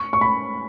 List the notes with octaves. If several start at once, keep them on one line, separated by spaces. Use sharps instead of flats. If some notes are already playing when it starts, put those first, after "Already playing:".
Already playing: C#6
C#6
B5